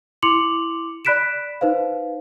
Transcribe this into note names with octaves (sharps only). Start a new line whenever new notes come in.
E4 C6 D6 C#7 F7 F#7
D5 B5 F#6 B6 D7 E7
D#4 B4 C5 F5